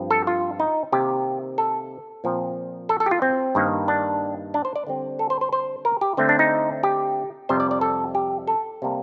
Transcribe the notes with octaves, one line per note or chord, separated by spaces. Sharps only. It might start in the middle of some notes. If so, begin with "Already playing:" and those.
Already playing: G2 F3 C4
A4
F4
D#4
C3 D#3 A#3 G4
A4
A#2 F3 C4
A4
A4
G4
F4
C4
G2 D#3 A#3
D4
D4
C5
D5
D3 G3 C4
A4
C5
C5
C5
A#4
G4
D3 A3 C4
D4
D#4
G4
F2 C3 G3 C5
D5
D5
A4
G4
A4
C3 G3 A#3